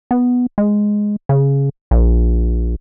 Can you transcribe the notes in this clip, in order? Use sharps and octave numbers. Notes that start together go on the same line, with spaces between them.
B3
G#3
C#3
A#1